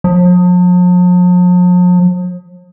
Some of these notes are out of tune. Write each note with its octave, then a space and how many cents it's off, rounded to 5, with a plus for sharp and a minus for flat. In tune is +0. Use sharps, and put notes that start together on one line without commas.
F3 +45